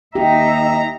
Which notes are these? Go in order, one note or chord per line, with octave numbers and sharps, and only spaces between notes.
D#2 D#4 G4 E5 A#5